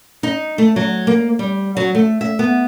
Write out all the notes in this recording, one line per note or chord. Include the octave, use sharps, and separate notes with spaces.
D#4
A3
F#3
A#3
G3
F#3
A3
E5
B3